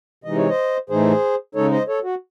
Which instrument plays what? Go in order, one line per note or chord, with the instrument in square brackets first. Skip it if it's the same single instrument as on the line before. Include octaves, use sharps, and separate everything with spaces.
[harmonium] C3 E3 G#3 D#4 D#5
C#5
C5 D#5
A2 E3 A3 D#4 G#4 C5
C#3 G#3 D#4 A4 C#5
C5 D#5
A4 C#5
F#4